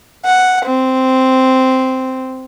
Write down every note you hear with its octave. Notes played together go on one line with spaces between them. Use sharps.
F#5
C4